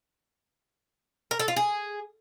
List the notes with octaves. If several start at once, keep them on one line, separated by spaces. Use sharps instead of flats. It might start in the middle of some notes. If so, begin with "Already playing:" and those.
A#4
A4
F4
G#4